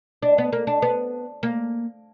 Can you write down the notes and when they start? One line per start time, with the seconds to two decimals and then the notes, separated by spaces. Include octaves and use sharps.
0.23 D4
0.38 B3
0.53 A#3
0.67 D4
0.82 B3
1.43 A#3